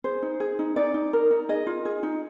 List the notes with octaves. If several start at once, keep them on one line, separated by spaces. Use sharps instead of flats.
G#4 C5
D#4
G#4
D#4
D#4 D5
D#4
A#4
D#4
G#4 D#5
F4
G#4
D#4